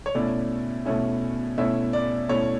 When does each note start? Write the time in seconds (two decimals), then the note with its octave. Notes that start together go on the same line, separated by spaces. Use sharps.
0.06 C#5
0.15 B2 A3 C#4 E4 D5
0.86 B2 A3 C#4 E4
1.58 B2 A3 C#4 E4 E5
1.93 D5
2.29 B2 A3 C#4 E4 C#5